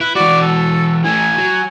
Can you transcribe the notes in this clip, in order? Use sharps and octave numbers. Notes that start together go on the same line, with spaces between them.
E4 B4
E3 F#4 D5
A4
E3 A3 G#5
F#3